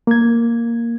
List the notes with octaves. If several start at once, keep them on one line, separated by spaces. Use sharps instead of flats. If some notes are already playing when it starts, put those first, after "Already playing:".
A#3 G#6